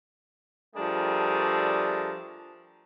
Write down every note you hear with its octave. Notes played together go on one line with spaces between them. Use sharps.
F3 G3 A3 D4 G#4 A#4